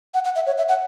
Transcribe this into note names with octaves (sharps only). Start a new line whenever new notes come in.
F#5
F#5
E5
C#5
E5
F#5